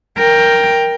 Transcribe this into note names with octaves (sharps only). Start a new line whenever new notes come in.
A#4 G5